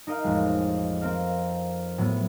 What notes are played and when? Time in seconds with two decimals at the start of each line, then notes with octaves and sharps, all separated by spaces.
0.07 D#4 A#4 D#5 F5
0.24 A1 F2 G#3
1.01 C4 A#4 F5
1.98 A2 F#3 B3